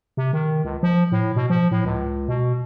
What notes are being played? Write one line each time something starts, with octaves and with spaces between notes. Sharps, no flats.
C3
D#3
C#2
F3
A2
B2
F3
A2
C#2
B2